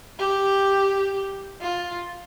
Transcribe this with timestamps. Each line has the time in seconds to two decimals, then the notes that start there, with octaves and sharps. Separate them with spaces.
0.19 G4
1.61 F4